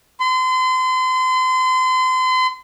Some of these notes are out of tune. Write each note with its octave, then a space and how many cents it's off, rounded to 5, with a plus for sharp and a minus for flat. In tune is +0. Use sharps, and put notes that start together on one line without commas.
C6 -35